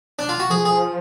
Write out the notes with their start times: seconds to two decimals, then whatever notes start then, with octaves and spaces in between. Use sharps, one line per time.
0.19 D4
0.29 F4
0.40 F#4
0.50 F3 G#4
0.65 G#4